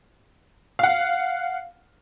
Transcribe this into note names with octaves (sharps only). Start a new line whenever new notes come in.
F5 F#5